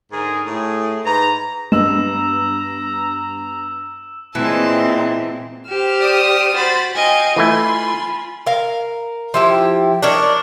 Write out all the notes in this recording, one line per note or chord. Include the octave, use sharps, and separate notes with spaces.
G#2 D3 G#4 A#4
A2 A3 G#4
G#2 B4 A#5
G2 G#3 B3 A#5 E6 E7
A#2 E3 G#3 C4 A5
G4 C5 F6 E7
D5 D#6
F#4 C5 B5 A6
D#5 F5 G5 G#5
E3 A3 E4 F4 G#5 B5 C6
A#4 F5
F3 E4 G4
D4 D#4 A#4 C#5